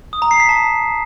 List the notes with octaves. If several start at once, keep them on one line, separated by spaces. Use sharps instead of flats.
D#6
A#5
C7
B6
A5